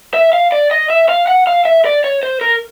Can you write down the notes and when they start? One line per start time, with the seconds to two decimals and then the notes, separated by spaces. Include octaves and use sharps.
0.14 E5
0.33 F5
0.52 D5
0.71 D#5
0.90 E5
1.09 F5
1.27 F#5
1.47 F5
1.65 E5
1.85 D5
2.04 C#5
2.23 C5
2.41 A#4